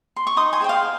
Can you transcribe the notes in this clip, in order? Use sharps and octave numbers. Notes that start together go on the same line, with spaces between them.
C6
C#6
D#4 C6 D#6
G#5 C6
G#4 C5 G5
F5